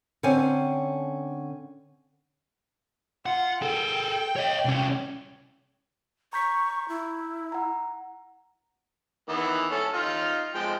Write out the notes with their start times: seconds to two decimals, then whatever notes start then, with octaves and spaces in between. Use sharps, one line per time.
0.23 D3 C4 C#4 C#5 G#5
3.26 F4 F#5
3.62 G#4 A4 G5
4.36 C#5 D#5
4.65 C2 C#4
6.33 A#5 C#6 G6 B6
6.89 E4
7.52 F#5 A#5
9.29 D#3 E3 B3
9.71 C#4 A4 C#5
9.94 D#4 F4
10.55 F3 G#3 G5